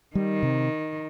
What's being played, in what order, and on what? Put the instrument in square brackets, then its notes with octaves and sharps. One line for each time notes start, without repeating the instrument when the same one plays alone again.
[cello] D#3 [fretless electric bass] G3
[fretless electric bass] C3